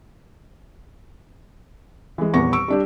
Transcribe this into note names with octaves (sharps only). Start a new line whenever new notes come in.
E3 G#3
D#1 E2 B3 C#6 A#6
C#6 E6 D7
G3 D4 G4